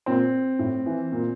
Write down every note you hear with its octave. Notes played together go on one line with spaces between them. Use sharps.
A#2 C4
A2
E3
A#2